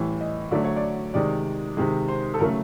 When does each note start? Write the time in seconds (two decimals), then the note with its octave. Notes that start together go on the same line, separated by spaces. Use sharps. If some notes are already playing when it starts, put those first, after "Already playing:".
Already playing: A2 E3 G3
0.21 D#5
0.51 D3 F#3 A3 D5
0.64 C#5
0.76 D5
1.14 C3 D#3 G#3 D5
1.77 C3 D#3 G#3
2.08 C5
2.34 A4
2.40 C#3 F#3 A3 A#4